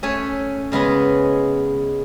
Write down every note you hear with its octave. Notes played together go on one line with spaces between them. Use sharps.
A3 C#4 C#5 G#5 A5
C#3 G#3 B3 G#4